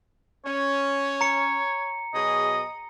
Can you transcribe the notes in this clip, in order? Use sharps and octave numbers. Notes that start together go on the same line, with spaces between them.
C#4 C#5
A#5 C#7
B2 F#3 G#4 D#5